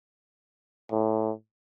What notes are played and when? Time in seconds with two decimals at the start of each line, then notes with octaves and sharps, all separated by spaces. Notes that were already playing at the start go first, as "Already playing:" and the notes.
0.92 A2